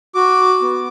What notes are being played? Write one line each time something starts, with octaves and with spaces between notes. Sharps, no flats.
F#4 D6
B3